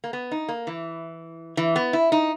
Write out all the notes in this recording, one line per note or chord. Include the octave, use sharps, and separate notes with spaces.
A#3
B3
D#4
A#3
E3
E3
B3
E4
D#4